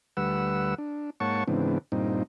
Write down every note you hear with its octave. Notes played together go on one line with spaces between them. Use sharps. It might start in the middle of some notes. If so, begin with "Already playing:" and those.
D2 G3 B4 F#5 E6
D4
G#2 A#3 C#5 F#5 A5 C#6
G#2 C#3 E3 B3 C4 D4
G2 A#2 C4 D#4